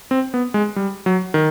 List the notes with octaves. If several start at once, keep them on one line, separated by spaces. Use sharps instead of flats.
C4
B3
G#3
G3
F#3
D#3